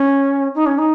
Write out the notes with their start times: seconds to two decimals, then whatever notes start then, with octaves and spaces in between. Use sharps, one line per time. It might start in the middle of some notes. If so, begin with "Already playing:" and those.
Already playing: C#4
0.55 D#4
0.66 C#4
0.78 D#4